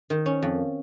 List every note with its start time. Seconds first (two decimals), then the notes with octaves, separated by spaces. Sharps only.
0.10 D#3
0.26 C#4
0.42 F2